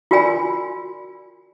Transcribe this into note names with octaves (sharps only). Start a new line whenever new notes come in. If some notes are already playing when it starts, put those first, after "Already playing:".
F4 F#4 A#4 D5 G#5 B5